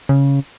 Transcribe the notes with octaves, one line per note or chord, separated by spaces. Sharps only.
C#3